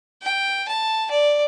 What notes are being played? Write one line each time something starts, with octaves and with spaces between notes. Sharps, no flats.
G5
A5
D5